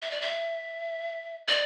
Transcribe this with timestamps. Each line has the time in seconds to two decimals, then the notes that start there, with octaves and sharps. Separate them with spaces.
0.02 E5
0.11 D5
0.22 E5
1.48 D5